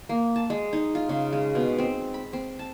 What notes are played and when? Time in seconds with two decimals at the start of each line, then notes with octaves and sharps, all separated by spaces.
0.09 A#3
0.36 A5
0.50 G#3
0.73 D#4
0.95 F4
1.09 C#3
1.33 G#3
1.55 B2
1.78 C4
2.14 B5
2.33 C4
2.59 A5